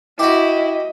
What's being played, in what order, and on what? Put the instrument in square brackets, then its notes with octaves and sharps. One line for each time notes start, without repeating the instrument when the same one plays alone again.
[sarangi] E4 [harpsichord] F#4 G4 [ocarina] D#5